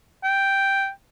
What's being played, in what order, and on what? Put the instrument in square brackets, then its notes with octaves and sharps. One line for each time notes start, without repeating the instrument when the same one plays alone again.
[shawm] G5